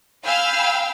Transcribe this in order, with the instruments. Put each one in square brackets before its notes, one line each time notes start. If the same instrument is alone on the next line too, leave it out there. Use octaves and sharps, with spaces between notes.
[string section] F5 G5 G#5 B5 E6 F6